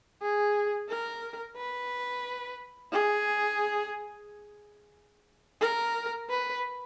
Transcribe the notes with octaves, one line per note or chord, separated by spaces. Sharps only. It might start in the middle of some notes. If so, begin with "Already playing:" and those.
G#4
A#4
B4
G#4
A#4
B4